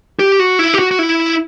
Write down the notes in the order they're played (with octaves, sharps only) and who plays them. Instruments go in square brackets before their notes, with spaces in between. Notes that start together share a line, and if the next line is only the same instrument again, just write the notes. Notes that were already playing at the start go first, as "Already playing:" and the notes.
[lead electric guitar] G4
F#4
E4
G4
F#4
F#4
E4